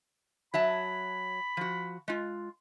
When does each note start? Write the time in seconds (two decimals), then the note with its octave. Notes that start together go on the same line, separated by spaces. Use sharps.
0.54 F#3 E5 A5 B5
1.57 F3 F#4
2.08 G#3 F4